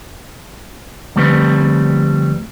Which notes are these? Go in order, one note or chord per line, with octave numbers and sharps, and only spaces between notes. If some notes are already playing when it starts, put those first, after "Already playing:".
F2 D3 G3 A3 C4 B4